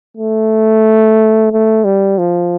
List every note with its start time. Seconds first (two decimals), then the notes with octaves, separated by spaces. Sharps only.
0.17 A3
1.51 A3
1.84 G3
2.18 F3